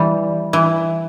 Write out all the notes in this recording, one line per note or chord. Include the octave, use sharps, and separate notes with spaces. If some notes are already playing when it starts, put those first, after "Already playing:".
Already playing: E3 G3
E3